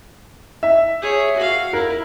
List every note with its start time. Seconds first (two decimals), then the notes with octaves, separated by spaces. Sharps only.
0.63 E5
1.02 G#4 C#5
1.36 F#4 F5
1.73 E4 A#4